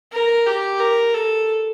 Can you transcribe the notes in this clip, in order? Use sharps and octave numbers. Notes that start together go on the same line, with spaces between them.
A#4
G4
A#4
A4